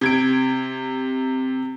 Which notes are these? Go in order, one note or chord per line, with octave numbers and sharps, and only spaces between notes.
C3 G#6 D7